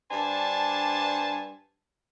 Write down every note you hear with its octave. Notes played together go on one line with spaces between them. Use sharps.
G2 D4 C5 G#5 A5